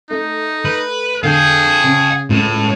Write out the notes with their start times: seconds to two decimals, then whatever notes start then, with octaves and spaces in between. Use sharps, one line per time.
0.10 A3 D#4
0.65 B4
1.24 D3 G#4 F5 G5
1.84 C#3
2.30 C#2 A2